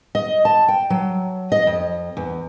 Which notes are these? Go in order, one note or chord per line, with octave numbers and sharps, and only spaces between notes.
D#5
A5
G5
F#3
D#5
F2
E2